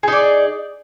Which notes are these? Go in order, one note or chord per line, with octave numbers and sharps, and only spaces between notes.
D#4 G#4 D5